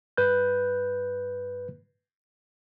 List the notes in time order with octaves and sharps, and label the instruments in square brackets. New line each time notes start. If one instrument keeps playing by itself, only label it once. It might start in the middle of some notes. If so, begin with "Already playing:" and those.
[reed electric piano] G2 B4 F#6 G6